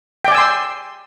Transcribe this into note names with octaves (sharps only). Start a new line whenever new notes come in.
D5 G5 G#5 C6 E6